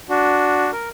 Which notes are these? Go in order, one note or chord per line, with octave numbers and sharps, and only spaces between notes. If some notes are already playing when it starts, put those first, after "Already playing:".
D4 F#4
A#4